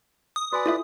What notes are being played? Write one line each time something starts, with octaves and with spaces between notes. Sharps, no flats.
D#6
F#4 B4 D5 G#5
E4 F4 A4 E5